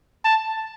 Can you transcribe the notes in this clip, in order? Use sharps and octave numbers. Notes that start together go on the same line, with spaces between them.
A5